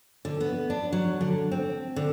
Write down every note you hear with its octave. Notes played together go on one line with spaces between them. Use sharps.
D3
B3
D4
F#3
D3
C4
D3